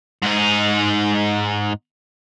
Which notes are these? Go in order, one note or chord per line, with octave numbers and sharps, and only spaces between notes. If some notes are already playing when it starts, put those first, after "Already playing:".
G#2 D#4